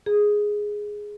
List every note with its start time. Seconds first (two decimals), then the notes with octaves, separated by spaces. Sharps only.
0.06 G#4